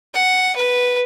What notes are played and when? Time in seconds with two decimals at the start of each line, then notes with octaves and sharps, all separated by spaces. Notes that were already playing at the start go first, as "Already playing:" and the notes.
0.14 F#5
0.56 B4